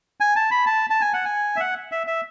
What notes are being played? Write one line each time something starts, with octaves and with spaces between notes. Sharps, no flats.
G#5
A5
B5
A5
A5
G#5
F#5
G#5
E5
F#5
E5
E5